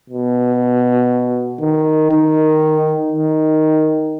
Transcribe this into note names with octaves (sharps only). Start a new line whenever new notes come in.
B2
D#3
D#3
D#3